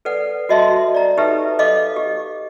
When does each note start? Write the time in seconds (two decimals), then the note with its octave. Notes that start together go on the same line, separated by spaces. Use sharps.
0.05 A4 B4 D5 F#5
0.49 F#4 A4 D#5 E5 A5 C6
0.94 D5 A#5
1.17 D#4 G4 A4 B4 E5
1.59 A4 D#5 F5 D6
1.96 G4